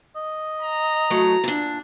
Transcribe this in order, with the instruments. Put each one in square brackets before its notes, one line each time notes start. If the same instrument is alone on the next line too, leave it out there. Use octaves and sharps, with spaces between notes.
[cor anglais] D#5
[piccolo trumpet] A#5
[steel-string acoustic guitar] E3 F#3 A3
A#2 D4